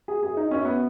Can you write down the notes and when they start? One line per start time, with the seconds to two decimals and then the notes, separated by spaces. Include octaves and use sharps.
0.08 G#4
0.23 F#2 G#4
0.37 D#4
0.51 F#2 C#4
0.65 B3